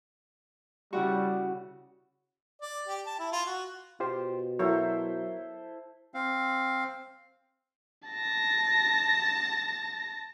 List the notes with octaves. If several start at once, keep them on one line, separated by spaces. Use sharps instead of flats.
C#3 G3 E4 F#4
D5
G4
A5
E4
F4
F#4
B2 F4 G4 C5
F#3 E4 A4 A#4 C5 C#5
C4 F5
A5 A#6